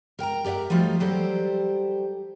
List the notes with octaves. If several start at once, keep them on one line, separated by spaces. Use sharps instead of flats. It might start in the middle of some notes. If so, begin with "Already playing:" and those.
A#4 G5 A5 A#5
G4 A#4 D5 E5 F#5
F3 G3 A3 D#4 F4 F#4
F#3 G3 G4 A4 C5